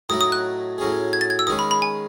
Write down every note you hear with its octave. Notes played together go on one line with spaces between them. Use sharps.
A2 F#3 A3 D#4 D#6
D#6
F#6
A2 F#3 C#4 G#4
G#6
A6
G#6
E6
D#3 G#3 C#4 G#4 D#6
B5
B5
G#5